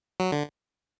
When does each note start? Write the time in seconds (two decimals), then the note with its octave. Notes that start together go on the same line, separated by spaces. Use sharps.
0.20 F#3
0.32 D3